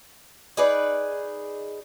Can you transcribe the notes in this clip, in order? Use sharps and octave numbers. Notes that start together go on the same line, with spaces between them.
D#4 G#4 B4 D5